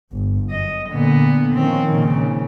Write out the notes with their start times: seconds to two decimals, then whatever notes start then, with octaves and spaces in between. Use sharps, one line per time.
0.12 G1
0.50 F#2 D#5
0.90 A#2 D3 B3
1.55 D#3 F3 C4 C#4
1.90 A#2 C#3